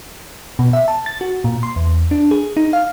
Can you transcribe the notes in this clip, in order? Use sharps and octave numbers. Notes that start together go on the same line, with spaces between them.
B2
E5
A5
A6
F#4
A#2
C6
E2
D4
G#4
D#4
F5